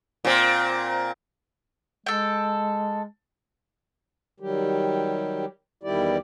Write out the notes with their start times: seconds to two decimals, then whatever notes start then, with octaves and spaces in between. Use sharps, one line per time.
0.25 A#2 C4
2.06 G#3 A4 G5
4.40 D#3 F#3 G3 G4
5.83 E2 D#3 G3 E4 G4 D5